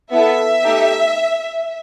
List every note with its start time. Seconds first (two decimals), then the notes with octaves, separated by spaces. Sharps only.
0.12 B3 E4 A4 E5
0.64 A3 D#4 G4